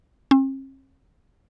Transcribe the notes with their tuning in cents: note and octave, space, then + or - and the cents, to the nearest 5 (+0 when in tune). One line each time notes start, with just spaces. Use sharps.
C4 +45